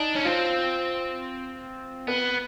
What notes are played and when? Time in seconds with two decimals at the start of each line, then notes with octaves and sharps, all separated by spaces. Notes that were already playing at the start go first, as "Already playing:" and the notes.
Already playing: D4 D#4
0.15 C#4
0.25 C4 F4
2.07 B3 B4